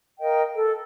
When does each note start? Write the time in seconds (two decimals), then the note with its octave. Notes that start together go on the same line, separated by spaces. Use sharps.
0.20 A#4 D#5 F5 G5
0.54 A4